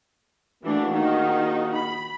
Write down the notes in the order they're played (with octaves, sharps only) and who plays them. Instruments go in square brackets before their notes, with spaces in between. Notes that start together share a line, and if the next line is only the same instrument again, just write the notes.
[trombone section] A#1 A#3 F#4 [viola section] E3 A3 D4
[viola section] D#3 D#4
B5